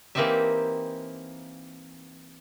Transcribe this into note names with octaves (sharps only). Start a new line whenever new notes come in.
E3 A#3 C4 D#4 G4 E5